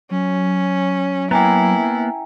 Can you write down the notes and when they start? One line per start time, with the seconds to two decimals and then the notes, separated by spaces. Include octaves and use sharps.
0.11 F#3 C#4
1.31 A#3 B3 E4 G5 G#5 A#5